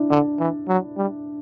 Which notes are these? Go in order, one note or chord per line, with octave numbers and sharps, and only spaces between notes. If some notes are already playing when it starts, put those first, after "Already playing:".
Already playing: D4 E4
D3 D4
E3
F#3
G3